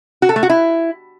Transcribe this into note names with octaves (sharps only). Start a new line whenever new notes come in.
F#4
A4
A3
F#4
E4